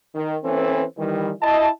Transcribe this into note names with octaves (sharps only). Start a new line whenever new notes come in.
D#3
E3 A#3 C4 C#4 A4 B4
D#3 E3 G3
E4 D#5 A5